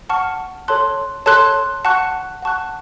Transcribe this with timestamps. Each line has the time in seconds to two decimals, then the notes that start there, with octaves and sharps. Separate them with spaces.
0.10 F#5 A5 C#6 F6
0.68 A4 C#5 A5 C6 F#6
1.26 A4 C#5 A5 C6 F#6
1.85 F#5 A5 C#6 F#6
2.42 F#5 A5 C#6 F#6